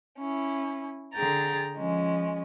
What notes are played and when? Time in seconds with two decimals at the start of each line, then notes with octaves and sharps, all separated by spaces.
0.18 C#4 E4
1.15 D3 G#4 G5 A#5 A6
1.77 F3 G#3 C#4